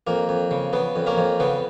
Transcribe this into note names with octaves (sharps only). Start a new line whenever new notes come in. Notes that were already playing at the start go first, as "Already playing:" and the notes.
F2 A#3
F2
C#3
C#3 B3
F2
A#3 C#4
F2
C#3 B3